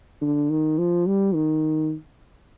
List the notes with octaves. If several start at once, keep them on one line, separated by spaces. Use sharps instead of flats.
D3
D#3
F3
G3
D#3